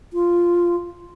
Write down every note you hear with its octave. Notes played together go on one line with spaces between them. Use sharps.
F4